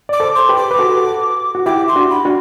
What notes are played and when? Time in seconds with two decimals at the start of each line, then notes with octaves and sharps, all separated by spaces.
0.09 D5 D6
0.20 A4 C5
0.35 C6
0.49 G4 B4
0.57 D6
0.71 B4
0.79 F#4 A4
1.55 F#4
1.66 E4 G4 D6
1.88 C6
1.96 D4 F#4
2.10 B5
2.25 D4 F#4